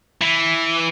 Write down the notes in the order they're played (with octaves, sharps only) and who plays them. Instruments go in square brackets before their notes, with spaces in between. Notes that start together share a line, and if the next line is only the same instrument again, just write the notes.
[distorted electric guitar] E3